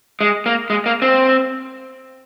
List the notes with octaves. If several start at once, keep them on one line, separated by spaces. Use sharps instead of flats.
G#3
A#3
G#3
A#3
C4